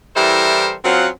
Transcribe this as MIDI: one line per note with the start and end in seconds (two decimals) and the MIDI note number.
0.16 0.74 52
0.16 0.74 55
0.16 0.74 64
0.16 0.74 69
0.16 0.74 70
0.16 0.74 72
0.85 1.08 54
0.85 1.08 60
0.85 1.08 61
0.85 1.08 65
0.85 1.08 77
0.85 1.08 78